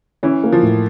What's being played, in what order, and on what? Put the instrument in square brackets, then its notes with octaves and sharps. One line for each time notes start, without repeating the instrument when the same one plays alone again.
[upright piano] E3 [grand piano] C#4
[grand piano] A#3
[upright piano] F3
[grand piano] A2